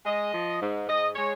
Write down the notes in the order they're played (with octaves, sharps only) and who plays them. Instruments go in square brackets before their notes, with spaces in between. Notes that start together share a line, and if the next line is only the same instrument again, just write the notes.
[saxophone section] G#3 D#5
F3
G#2
G#2 D#5
G#3 C#5